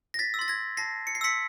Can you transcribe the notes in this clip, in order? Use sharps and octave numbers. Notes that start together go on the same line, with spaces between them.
A#6
A6 B6
E6
C6 A6
G#6 A#6
A5 A#6 C7
C#7
C7
C6 E6 B6 C#7